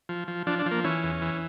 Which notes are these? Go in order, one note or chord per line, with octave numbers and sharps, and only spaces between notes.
F3
F3
F3 D4
D4
F3
A#3
E3 C#4
E2
E3